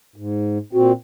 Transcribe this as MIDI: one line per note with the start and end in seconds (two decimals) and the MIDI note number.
0.16 0.58 44
0.73 0.92 46
0.73 0.92 60
0.73 0.91 66